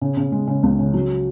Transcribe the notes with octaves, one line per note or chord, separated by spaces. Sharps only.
C#3
C#3
G#3
C#3
C#2
C#3
F#3